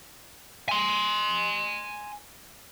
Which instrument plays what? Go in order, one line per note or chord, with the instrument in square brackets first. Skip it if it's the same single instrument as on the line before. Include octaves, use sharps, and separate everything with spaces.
[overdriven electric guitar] G#5 C6